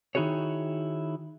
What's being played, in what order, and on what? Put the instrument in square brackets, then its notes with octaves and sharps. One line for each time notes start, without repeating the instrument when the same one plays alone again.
[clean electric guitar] D#3 D#4 E4 F#4 G#4 C#5